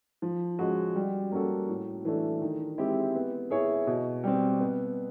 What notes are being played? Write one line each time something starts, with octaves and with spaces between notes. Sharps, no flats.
F3
G#3 C#4 F#4
G3
A#3 C#4 F#4 A4
A2
E3 A3 D4
D#3
G#3 C4 E4 G4
B3
E4 G#4 C#5
B2
G3 C4
B3